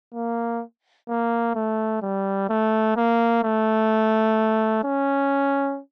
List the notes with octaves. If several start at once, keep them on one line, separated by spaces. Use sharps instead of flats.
A#3
A#3
A3
G3
A3
A#3
A3
C#4